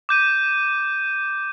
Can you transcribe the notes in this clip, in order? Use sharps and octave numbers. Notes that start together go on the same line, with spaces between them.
D6 G6 D#7